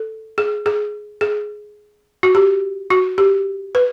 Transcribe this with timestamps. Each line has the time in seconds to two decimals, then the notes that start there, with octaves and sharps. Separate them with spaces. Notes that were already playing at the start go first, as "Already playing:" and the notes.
Already playing: A4
0.38 G#4
0.66 G#4
1.21 G#4
2.23 F#4
2.35 G4
2.90 F#4
3.18 G4
3.75 B4